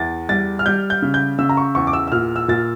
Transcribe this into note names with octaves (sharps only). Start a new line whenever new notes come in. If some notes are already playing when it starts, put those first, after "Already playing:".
Already playing: E2 A6
G3 A6
F6
G3 G6
G6
C#3
G6
C#3 E6
A#5
C#6
E2 C#6
D6
E6
E6
A#2 F6
E6
A#2 A6